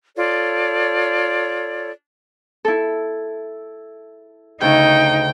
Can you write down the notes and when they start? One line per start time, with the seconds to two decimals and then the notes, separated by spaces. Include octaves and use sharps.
0.16 F4 A4 C#5 D5
2.65 E4 A4
4.61 D2 C#3 D#4 G5